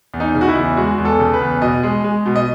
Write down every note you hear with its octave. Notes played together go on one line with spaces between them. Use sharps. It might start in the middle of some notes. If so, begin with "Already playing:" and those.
E2
D#4
C#3
F#4
E4
E2
G#3 F#4
E2
A4
C#3
B4
E2
B2 D#5
G#3
G#3
B2
D#5